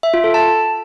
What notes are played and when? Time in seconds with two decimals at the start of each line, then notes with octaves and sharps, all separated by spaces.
0.03 E5
0.14 F4
0.24 A4
0.34 A5